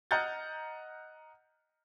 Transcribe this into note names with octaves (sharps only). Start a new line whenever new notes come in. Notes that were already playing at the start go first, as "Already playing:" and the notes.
D#5 F#5 A#5 F6 G6 A6